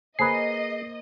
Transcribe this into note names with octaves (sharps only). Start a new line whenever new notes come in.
A#3 G#4 B4 C5 D#5 C7